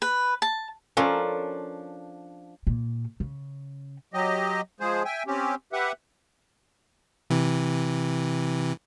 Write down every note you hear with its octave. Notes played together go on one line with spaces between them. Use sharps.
B4
A5
F3 C#4 D4 A4 A#4
A#2
C#3
F#3 G4 D#5
F3 G#3 G#4 C5
E5 G5 G#5
C4 C#4 G4
G4 B4 E5 F#5
C3 E3